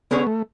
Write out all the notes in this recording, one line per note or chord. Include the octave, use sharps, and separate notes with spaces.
D3 G#3 B3 C#4 G#4 C#5
A3